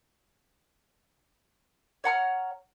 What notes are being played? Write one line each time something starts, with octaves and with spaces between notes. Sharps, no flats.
C#5 F#5 A#5 F6